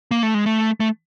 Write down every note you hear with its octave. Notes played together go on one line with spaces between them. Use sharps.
A#3
A3
G#3
A3
A3